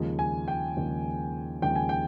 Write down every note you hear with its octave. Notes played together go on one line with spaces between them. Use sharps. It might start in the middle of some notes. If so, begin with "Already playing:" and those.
Already playing: D#2 C#3 F3 G#3
G#5
G5
D#2 C#3 F3 G#3
D#2 C#3 F3 G#3 G5
G#5
G5